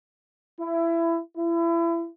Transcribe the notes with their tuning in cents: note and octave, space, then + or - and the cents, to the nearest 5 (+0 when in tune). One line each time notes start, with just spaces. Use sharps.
E4 +20
E4 +30